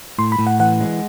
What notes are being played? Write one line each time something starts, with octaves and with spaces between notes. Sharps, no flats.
A2 C6
B5
A2
F#5
E3 F#5
G#3